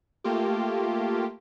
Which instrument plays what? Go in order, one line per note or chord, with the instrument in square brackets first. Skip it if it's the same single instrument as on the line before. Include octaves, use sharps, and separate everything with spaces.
[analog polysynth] A3 A#3 F4 G4